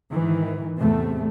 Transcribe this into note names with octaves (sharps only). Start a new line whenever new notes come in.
G#2 D#3 E3
A1 E2 C3 A3